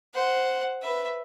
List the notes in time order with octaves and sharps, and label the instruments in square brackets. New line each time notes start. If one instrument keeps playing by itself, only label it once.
[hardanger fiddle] C5 [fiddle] F#5
[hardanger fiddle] B4 [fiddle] E5